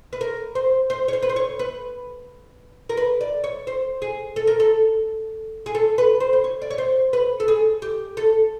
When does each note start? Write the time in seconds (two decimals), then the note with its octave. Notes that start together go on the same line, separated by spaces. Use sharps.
0.13 B4
0.21 A#4
0.55 C5
0.90 C5
1.08 C#5
1.13 C5
1.22 B4
1.29 C5
1.36 C#5
1.59 B4
2.89 A#4
2.97 B4
3.21 D5
3.44 C#5
3.67 C5
4.02 G#4
4.36 A4
4.47 A#4
4.60 A4
5.66 G#4
5.75 A4
5.98 B4
6.20 C5
6.33 C5
6.44 C#5
6.62 D5
6.70 C#5
6.78 C5
7.13 B4
7.40 A4
7.48 G#4
7.82 G4
8.17 A4